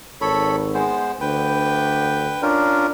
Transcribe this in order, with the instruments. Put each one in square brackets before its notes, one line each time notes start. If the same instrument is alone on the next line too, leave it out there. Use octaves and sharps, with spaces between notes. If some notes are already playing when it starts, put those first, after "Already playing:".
[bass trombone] G#1 [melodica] A4 C#5 B5
[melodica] G#3 B3 C5
[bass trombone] D2 [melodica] B4 G5
[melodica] C#4 F4 A#4 [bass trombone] D4